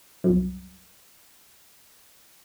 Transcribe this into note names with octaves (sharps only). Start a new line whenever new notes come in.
C2 F#2